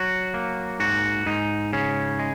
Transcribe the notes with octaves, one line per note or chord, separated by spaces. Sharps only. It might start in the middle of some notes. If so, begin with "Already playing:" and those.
Already playing: F#3 F#4
A#3
G#2 F#4
G#2 D#4
C#3 C#4
G#3